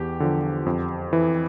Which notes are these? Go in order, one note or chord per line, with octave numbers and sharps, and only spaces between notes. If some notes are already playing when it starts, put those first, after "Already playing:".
Already playing: E2 G4
D3 F3
F2
E3